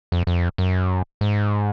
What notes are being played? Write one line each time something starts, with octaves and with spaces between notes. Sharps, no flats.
F2
F2
F#2
G#2